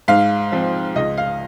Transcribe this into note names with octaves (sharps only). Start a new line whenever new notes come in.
G#2 F5
F3 C4
C#2 D#5
F5